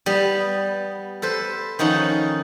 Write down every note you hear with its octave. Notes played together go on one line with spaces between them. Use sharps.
G3 B3
A4 B4 C5
D#3 F3 C#4 D#4 F#5